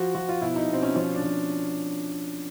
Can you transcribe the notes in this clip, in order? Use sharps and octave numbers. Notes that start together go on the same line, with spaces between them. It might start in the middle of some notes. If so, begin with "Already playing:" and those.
Already playing: F3 F#4
F3 F#4
F4
B2 E4
D#4
B2 C4
C#4
F3 C#4
D4
F3